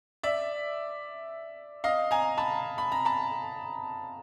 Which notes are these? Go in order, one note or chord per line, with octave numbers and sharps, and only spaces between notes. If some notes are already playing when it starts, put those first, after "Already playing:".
D5 E5
D#5 F5
G#5 A#5
A5 B5
B5
A#5
A5 B5